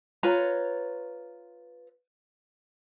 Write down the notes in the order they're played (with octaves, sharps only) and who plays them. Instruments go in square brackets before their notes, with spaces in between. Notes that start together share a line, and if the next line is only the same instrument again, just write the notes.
[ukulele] F4 B4 C#5 A#5